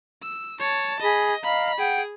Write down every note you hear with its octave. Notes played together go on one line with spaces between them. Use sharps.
E6
C#5 A5
G#4 D#5 B5
D#5 F5 A#5 B5
G#4 F#5 G5